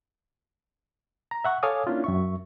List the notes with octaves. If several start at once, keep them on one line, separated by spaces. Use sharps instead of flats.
A#5
E5 F#5 C#6
A4 C#5 F5 G#5 D6 D#6
A#3 C#4 D4 E4 F4
F#2 E5 C#6